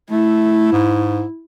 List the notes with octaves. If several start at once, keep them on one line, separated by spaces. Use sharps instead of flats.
A3 E4
G#2